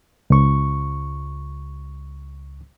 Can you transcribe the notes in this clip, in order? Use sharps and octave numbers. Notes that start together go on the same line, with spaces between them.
C#2 C#6